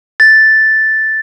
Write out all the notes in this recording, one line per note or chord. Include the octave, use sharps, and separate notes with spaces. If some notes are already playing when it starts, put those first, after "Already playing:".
A6